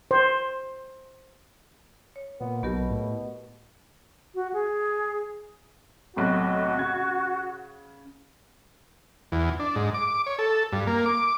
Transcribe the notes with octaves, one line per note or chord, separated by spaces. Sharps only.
C5
C#5
A#2 B3
B1 B2 B3 G4 A#4
A2
F#4
G#4
B1 A2 C3 F#4
C#3 G#6
E2
D4
G#2
D6
C#5
A4
G2
A#3
D6